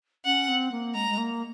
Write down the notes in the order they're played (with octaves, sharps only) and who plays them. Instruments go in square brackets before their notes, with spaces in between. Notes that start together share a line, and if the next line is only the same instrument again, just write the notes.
[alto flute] C#4 [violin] F#5
[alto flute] C4
A#3
[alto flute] G#3 [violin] A#5
[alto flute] G#3
A#3